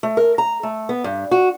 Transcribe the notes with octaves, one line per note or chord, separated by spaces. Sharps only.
A3
A#4
A#5
A3
B3
G2
F#4